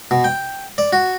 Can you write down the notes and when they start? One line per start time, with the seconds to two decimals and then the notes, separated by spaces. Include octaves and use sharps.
0.11 B2
0.24 G5
0.78 D5
0.93 F#4